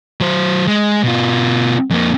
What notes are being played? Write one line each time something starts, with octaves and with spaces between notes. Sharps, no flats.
F#3 C5
G#3
B2 F4
F2 A#3